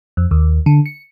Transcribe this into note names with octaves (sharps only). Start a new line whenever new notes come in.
F2
D#2
D3
C#7